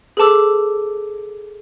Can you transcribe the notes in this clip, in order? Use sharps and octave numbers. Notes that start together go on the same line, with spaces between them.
G#4 A4 B4 A5 D6 E6